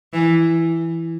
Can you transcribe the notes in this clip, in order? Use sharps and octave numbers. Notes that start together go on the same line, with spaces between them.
E3